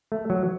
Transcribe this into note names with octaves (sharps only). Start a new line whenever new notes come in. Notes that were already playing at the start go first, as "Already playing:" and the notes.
A3
F#3